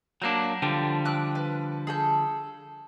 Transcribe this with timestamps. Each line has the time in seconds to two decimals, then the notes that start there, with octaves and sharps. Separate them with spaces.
0.22 F#3 A#3 D4 D6 G6
0.62 D3 F3 G3 G5
1.05 D6 E6 F#6
1.35 B4
1.87 G#4 A4 G6